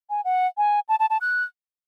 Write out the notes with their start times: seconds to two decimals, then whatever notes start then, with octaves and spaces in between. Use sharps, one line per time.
0.10 G#5
0.25 F#5
0.57 G#5
0.89 A5
1.00 A5
1.10 A5
1.21 F#6